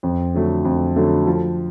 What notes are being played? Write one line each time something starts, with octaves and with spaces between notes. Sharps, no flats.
F2
D3 F#3 A3
F2
D3 F#3 A3
F3